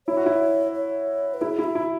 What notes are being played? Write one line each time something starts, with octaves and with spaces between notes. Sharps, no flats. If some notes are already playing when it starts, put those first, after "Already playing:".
E4 C#5
F#4
E4
C#5
B4
E4 G#4
E4
F#4
E4